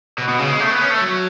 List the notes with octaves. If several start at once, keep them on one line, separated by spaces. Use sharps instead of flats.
B2
B2
C#3
G#3
A3
B3
C#4
A3
F#3